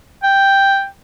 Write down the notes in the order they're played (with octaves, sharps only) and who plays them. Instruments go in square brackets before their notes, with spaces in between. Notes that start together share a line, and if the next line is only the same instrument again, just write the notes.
[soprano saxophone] G5